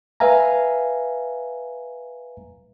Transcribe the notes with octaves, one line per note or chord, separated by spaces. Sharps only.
B4 E5 F5 G#5 A#5